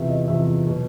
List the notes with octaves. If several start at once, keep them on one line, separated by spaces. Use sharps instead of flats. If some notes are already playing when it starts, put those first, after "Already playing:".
Already playing: E2 C3 F3 E5
D#5
E2 C3 F3 E5
B2 F#3